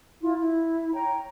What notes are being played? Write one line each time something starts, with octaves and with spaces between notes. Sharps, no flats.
E4 F4
E4
C#5 G5 A#5